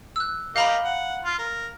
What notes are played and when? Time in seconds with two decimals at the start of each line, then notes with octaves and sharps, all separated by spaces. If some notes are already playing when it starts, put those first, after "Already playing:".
0.16 E6 F#6
0.56 G4 A#4 D#5 F5 A#5 B5
0.85 F#5
1.25 F4
1.39 A#4